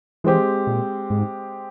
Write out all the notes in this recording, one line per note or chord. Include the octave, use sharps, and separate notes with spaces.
E3 G#3 C4 G4
A#2
G#2